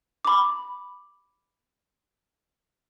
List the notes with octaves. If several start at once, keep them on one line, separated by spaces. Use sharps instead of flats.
B5 D6